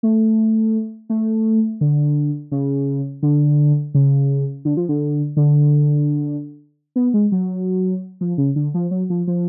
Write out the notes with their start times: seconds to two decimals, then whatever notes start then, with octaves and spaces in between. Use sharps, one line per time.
0.03 A3
1.10 A3
1.81 D3
2.52 C#3
3.23 D3
3.95 C#3
4.65 D3
4.77 F3
4.89 D3
5.37 D3
6.96 B3
7.14 G#3
7.32 F#3
8.21 F3
8.38 C#3
8.56 D3
8.74 F3
8.91 F#3
9.10 F3
9.27 F3